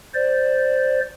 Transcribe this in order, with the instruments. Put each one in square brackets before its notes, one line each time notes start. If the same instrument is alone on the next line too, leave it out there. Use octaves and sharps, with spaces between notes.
[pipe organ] C5 D5